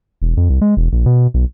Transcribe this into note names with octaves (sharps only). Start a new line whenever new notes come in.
E1
F2
C2
G#3
E1
A#1
B2
B1